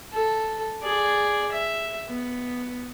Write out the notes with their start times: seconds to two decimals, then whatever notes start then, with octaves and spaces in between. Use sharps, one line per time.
0.13 A4
0.83 G#4 D5
1.52 E5
2.07 B3